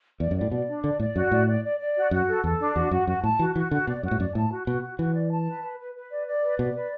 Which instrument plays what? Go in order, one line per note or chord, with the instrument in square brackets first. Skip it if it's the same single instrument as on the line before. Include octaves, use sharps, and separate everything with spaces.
[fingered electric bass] E2 [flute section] D5
[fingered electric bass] F#2
[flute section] D5
[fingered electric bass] A2
[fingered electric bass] B2 [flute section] D5
[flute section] D4
[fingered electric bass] D3 [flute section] D5
[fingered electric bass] A2 [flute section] D5
[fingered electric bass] F#2 [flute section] F#4
[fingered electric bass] A2 [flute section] D5
[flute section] D5
D5
D5
F#4
[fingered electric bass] F#2 [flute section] F#4
[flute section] A4
[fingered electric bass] E2 [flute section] A4
[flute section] D4
[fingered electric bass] E2 [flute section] F#4
[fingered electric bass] F#2 [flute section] F#4
[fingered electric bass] F#2 [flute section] F#4
[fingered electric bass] A2 [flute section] A5
[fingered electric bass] E3 [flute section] F#4
[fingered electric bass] E3 [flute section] F#4
[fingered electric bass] D3 [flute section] F#4
[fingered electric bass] B2 [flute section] D5
[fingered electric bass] F#2 [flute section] F#4
[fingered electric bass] A2
[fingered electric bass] F#2 [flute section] D5
[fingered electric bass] A2 [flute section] A5
[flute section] F#4
[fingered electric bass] B2 [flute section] F#4
[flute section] F#4
[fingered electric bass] E3 [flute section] F#4
[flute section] D5
A5
B4
B4
B4
B4
D5
D5
B4
[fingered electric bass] B2 [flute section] D5
[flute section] B4